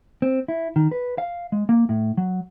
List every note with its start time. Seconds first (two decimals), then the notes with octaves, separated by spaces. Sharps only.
0.22 C4
0.48 E4
0.76 D#3
0.91 B4
1.18 F5
1.52 G#3
1.69 A#3
1.89 A2
2.17 F#3